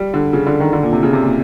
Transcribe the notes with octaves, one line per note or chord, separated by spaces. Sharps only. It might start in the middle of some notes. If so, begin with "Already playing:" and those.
Already playing: G3
D3
C#3
D3
D#3
D3
A#2
C3
C#3
C3
A#2